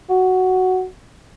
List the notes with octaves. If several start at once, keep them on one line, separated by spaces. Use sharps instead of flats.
F#4